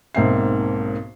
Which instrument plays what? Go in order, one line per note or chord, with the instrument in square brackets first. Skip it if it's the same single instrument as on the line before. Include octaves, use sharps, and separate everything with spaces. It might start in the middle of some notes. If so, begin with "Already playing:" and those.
[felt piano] B1 G#2 A#3 C4 E5 C7